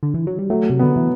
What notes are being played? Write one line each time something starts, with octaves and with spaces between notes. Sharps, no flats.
D3
E3
F#3
G3
F#3 A3
C3
D3 B3
E3